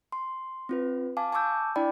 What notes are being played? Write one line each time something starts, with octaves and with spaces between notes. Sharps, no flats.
C6
C4 F4 B4
F5 G#5 A5 D6
G#5 A5 C#6 D6 E6 G6
D4 E4 D5 G5 B5